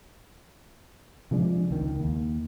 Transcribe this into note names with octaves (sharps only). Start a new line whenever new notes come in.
C3 F3 G#3 D4
C#2 D#3
D#2